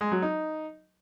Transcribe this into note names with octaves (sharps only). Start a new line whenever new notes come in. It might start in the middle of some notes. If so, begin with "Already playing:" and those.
G#3
F#3
D#4